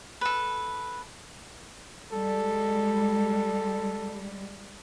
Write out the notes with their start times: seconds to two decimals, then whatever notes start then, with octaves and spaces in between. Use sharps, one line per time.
0.21 A4 B4
2.12 G3 G#3 A4